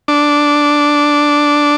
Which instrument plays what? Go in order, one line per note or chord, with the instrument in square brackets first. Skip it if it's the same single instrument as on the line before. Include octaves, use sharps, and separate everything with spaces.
[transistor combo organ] D4